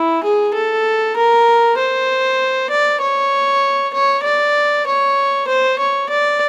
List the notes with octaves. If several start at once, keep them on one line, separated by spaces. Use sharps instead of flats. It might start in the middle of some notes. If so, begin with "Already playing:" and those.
Already playing: E4
G#4
A4
A#4
C5
D5
C#5
C#5
D5
C#5
C5
C#5
D5